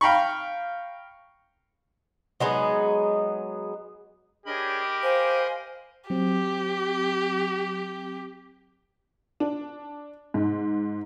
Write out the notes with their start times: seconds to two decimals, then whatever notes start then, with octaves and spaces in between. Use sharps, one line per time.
0.01 F5 G5 A#5 B5 C#6
2.40 F#3 G#3 B3 D#4
4.46 D4 G4 G#4 A#4 C#5 D#5 B5
5.03 C5 F5 G#5
6.10 F#3 C4 G4
9.40 D4
10.34 G#2